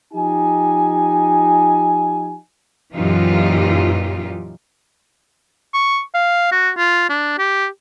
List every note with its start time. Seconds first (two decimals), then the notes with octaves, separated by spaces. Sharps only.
0.13 F3 D#4 G4 G#5
2.96 F#2 A#2 E3 D#4 F4 G4
5.74 C#6
6.14 F5
6.51 F#4
6.77 F4
7.09 D4
7.38 G4